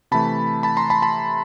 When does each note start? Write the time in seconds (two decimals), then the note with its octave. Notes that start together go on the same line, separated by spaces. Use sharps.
0.11 C3 E3 A3 A5 B5
0.63 A5 B5
0.77 A#5 C6
0.90 A5 B5
1.02 A5 B5